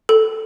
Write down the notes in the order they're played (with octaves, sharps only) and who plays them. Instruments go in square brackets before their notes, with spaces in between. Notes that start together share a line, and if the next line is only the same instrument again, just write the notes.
[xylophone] A4